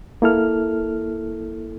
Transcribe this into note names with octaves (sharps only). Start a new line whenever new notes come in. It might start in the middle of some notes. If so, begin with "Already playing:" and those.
A#3 E4 A4 F6